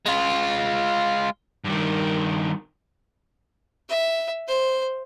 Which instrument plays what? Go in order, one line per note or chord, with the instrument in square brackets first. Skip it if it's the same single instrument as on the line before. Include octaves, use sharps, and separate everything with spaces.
[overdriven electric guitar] G#3 F4
G2 D#3
[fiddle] E5
C5